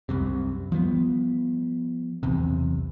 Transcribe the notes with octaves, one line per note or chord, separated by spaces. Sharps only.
C2 F#2 C3
F3 G3 A#3 B3
B1 E2 C3